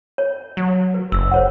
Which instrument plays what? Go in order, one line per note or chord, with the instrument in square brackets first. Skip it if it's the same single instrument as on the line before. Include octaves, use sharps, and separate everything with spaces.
[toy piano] C#5
[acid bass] F#3
[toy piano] B4
[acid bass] F#1 [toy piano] E6
[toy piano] C5 C#5 F#5